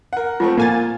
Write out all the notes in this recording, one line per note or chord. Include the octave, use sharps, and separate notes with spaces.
A#4 F#5
F3 A3 C4 F4
A#2 A#3 G#5 A6